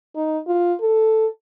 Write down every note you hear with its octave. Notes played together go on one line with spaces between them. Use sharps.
D#4
F4
A4